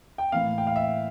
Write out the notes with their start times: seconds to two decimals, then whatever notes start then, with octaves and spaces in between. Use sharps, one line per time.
0.18 G5
0.32 A2 E3 A#3 F5
0.58 G5
0.67 F5
0.76 E5